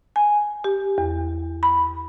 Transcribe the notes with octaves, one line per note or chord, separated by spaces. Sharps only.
G#5
G4
E2
B5